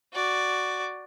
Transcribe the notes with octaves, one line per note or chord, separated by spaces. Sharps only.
F#4 D5